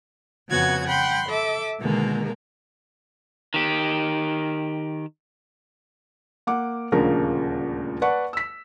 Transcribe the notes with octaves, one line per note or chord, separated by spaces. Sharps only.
F2 C#3 B3 F#4 F#5 G#6
F#5 G5 B5 C6
A4 E5 D6
B2 D3 D#3 G#3 A#3 A#4
D#3 G4
A#3 F#5 D6
D#1 D2 C#3 F3 A#4
B4 D5 F#5 A5 C#6
E6 B6